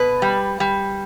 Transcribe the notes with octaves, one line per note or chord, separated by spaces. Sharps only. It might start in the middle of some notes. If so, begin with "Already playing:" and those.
Already playing: B2 B4
G3
G3